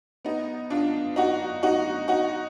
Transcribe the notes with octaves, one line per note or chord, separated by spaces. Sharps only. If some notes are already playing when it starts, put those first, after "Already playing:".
B3 D#4
D4 F4
D#4 F#4
D#4 F#4
D#4 F#4